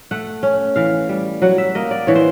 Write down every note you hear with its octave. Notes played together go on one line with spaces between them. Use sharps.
A3 F#5
C#4
E3 F5
G3
F#3 F#5
E5
A#3 D#5
D5
E3 C#5
C5